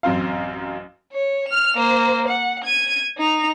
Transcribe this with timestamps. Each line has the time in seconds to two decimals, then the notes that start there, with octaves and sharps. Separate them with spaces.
0.03 A1 F#2 C4 F5
1.12 C#5
1.48 F6 F7
1.77 A#3 C5
2.28 F#5
2.64 G#6 D#7
3.17 D#4 F7